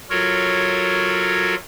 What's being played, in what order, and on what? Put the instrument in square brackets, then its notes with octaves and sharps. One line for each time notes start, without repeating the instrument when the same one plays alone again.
[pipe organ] F#3 F4 F#4 A4 A#4 C#5